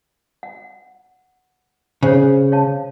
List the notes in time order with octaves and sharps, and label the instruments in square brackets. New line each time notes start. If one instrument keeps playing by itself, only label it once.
[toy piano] F#5
[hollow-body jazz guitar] C#3 [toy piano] C5 C#5
[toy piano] C#5 F5 A5